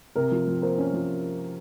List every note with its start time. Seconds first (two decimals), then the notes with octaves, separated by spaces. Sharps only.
0.16 C3 A#4
0.31 F3
0.47 F3
0.62 A#3 C5
0.78 C#4
0.93 F3